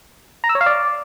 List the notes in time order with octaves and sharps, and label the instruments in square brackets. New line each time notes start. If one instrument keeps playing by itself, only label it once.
[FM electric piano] A#5
E6
C#5
F5
D5